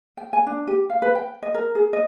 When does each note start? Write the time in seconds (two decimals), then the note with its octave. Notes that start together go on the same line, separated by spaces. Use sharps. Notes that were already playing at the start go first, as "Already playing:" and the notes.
0.17 G5
0.33 G#5
0.47 D4
0.67 G4
0.90 F5
1.02 B4
1.15 G5
1.42 D#5
1.54 A#4
1.75 G#4
1.93 D#5